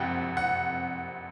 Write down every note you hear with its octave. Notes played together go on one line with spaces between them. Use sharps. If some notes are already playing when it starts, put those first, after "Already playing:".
Already playing: F#1 F2 C3 F#5 G5
F#5